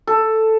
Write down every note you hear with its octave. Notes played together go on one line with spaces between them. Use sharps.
A4